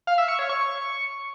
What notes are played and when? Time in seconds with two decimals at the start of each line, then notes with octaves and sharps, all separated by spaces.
0.07 F5
0.18 E5
0.28 C#6
0.39 C#5
0.49 C#6